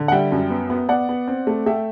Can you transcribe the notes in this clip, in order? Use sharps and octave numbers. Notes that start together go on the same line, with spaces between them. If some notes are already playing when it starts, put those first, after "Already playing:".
Already playing: D3
F#5
G3 E5 G5
F#2
B3
B3
B3 D5 F#5
B3
C4
A3
A3 E5 G5